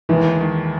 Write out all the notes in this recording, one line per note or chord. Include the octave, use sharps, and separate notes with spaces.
D#2 D#3 E3 G#3
D#2 D#3 G#3